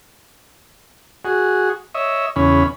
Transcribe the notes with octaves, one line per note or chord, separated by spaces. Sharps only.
F#4 G#4
C#5 D#5 E5
E2 C#3 C#4 B5